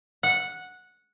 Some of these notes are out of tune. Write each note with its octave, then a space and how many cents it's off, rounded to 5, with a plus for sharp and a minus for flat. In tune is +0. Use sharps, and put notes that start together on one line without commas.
F#5 -10